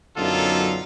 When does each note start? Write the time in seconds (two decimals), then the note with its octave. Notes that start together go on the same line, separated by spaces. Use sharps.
0.17 B1 F#2 D3 D#4 F4 A4